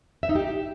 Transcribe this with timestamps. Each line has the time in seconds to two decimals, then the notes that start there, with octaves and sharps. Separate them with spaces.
0.23 E5
0.29 D#4
0.35 G4